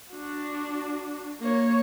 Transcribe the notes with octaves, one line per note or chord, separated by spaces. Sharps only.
D4 F#4
A#3 C#5